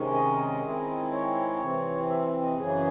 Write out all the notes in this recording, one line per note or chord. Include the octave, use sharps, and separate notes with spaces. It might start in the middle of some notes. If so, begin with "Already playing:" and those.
Already playing: C3 D#3 G#3 C#4
D#5
D#3 G#3 C4 E4
C#5
C3 E3 C4
E5
D#5
F#2 C#3 E3 G#4